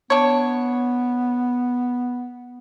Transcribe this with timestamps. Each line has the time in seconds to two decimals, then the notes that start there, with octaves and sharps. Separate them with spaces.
0.10 B3 D4 C#5